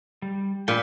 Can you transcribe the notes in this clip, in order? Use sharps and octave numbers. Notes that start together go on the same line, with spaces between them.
G3
A#2 G5 B5